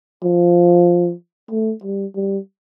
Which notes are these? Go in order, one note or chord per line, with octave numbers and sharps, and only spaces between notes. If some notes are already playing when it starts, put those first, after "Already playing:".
F3
A3
G3
G3